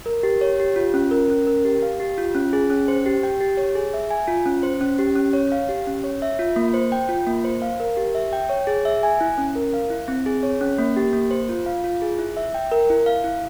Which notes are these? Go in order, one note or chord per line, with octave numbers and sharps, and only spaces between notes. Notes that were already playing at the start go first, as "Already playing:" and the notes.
A#4
G4
C#5
G4
F4
C#4
A#4
C#4
A#4
G4
F5
G4
F4
C#4
G#4
C#4
C5
G4
G5
G4
C#5
G#4
E5
G#5
F4
C#4
C5
C#4
G4
C#4
C#5
F5
G4
C#4
C#5
E5
F4
A#3
C5
G5
F4
A#3
C5
F5
A#4
G4
E5
G5
C#5
G#4
E5
G#5
E4
C#4
A#4
F5
E4
C4
G#4
C#5
C#4
A#3
G4
A#3
C5
F4
F5
F4
G#4
E4
E5
G5
A#4
E4
F5
E4